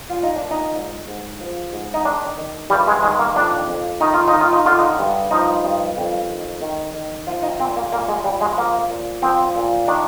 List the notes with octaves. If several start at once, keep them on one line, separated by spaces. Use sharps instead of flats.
A#2 F4
D#4
D4
A#2
D#4
G#2
G#2
F3
G#2
D#4
D#3 D4
D#3
G2 G3
G#3
D#3 G#3
A#3
F2 D4
F2
D#3 D#4
F4
D#4
D#3
F4
D#4
D3 F4
D#4
G2
F3 D#4
G2
F2
D#3
D#3
D#3
F3 F4
D#4
A#2 C4
A#3
A#2 A#3
G#3
A#2 G3
G#3
F3 A#3
A#2
F3 C4
A#2
D#3 D4